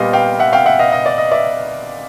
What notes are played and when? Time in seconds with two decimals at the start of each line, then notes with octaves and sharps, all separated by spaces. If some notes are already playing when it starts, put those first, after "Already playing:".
Already playing: A#2 G3 B3 D#5 F5
0.13 F5 G5
0.39 E5 F#5
0.53 F5 G5
0.66 E5 F#5
0.79 D#5 F5
0.92 D#5
1.06 D5
1.18 D#5
1.32 D5 E5